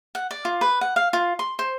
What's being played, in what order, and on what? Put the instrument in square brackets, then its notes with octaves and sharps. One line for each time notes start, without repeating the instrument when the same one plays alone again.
[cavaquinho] F#5
D5
F4
B4
F#5
F5
F4
C6
C5